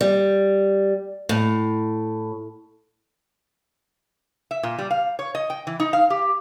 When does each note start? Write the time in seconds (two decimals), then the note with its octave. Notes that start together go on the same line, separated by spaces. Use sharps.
0.01 G3
1.29 A2
4.51 E5
4.63 A#2
4.79 G3
4.91 F5
5.19 C#5
5.35 D#5
5.50 G5
5.67 E3
5.80 D#4
5.93 F5
6.10 G4